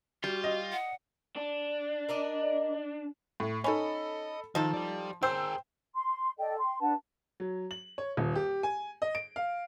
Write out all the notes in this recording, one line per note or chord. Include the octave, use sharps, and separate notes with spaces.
G3 F4 F#4
D#5
F#5
D4
A#4 D5 D#5
A2
C#4 D#4 A4 D#5 B5
D#3 F3 D#4 A4
G4 D5
G#4 A#4 C5 G5 E6
C6
A4 D5 D#5 G5
G5 C6
D4 B4 F#5 A5
F#3
F#7
C#5
D#1
G4
G#5
D#5
D7
F5